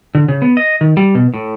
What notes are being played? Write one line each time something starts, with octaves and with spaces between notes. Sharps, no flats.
D3
C#3
B3
D#5
D#3
G3
B2
A2